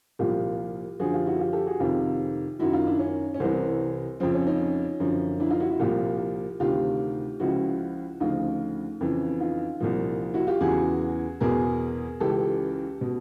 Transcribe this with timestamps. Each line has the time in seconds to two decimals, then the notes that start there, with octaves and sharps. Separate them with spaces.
0.19 C2 A#2 F3 F4 G4
1.00 F#2 D3 F3 F#4 G#4
1.13 F4 G4
1.26 E4 F#4
1.39 F4 G4
1.53 G4 A4
1.66 F#4 G#4
1.80 F2 C3 D#3 F4 G4
2.59 F#2 D#3 E4 F#4
2.73 D#4 F4
2.87 D4 E4
2.99 C#4
3.34 C#4
3.40 C2 C3 E3 C4
4.20 F2 C#3 F3 C4
4.34 C#4
4.47 C#4 D#4
5.00 F#2 D3 F3
5.40 D4 E4
5.50 D#4 F4
5.60 E4 F#4
5.70 E4 F#4
5.80 C2 A#2 F3 F4 G4
6.60 D2 C3 D#3 F4 G4
7.40 C#2 C#3 F3 E4 F#4
8.20 D2 C#3 F3 D#4 F4
9.01 F2 C#3 E3
9.40 D#4 F4
9.80 C2 A#2 F3
10.34 E4 F#4
10.47 F4 G4
10.61 E2 C#3 E3 F#4 G#4
11.40 E2 B2 G#4 A#4
12.20 C#2 C#3 E3 G4 A4
13.01 B2